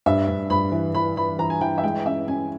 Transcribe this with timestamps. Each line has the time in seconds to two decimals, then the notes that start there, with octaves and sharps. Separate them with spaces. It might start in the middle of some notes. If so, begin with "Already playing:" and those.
0.06 G2 E5
0.28 G2
0.50 G2 B5
0.72 E3
0.94 E3 B5
1.16 E3 B5
1.39 E3 A#5
1.50 G#5
1.61 E3 G5
1.78 E5
1.83 G#3 G5
2.06 C#4 E5
2.28 C#4 G#5